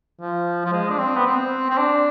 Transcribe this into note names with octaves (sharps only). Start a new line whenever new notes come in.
F3
F3
G#3
D4
C4
B3
C4
C4
D4